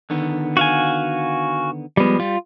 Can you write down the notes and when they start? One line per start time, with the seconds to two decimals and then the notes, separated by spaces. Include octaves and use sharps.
0.10 D3 D#3 B3
0.57 F#4 F5 G#5
1.97 F3 G3 G#3 B3
2.20 G3 F4